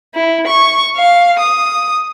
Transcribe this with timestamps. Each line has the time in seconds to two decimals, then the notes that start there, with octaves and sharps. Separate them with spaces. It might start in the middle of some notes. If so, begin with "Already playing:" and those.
0.15 E4
0.47 C#6
0.96 F5
1.39 D#6